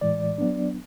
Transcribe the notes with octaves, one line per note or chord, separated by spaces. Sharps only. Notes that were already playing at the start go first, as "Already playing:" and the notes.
A2 E3 G#3 D5
F#3 B3 D4